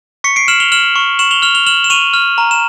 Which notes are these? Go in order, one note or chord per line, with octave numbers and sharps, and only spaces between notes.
C#6 B6 C#7
C7 D7
F6 E7 F#7
F7 G7
F6 E7 F#7
C#6
C#6 E7 F#7
F7 G7
F6 F7 G7
F7 G7
F6 E7 F#7
E7
C#6 D#7 F7
F6
A#5
E7